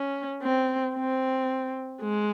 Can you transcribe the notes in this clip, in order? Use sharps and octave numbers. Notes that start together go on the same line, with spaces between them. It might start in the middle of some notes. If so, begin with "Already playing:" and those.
Already playing: C#4
C4
C4
G#3